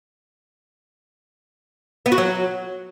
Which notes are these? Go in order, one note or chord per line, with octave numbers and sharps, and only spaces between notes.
B3
F#4
F#3